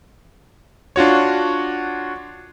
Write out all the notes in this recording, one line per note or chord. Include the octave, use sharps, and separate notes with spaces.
D4 F4 F#4 C#5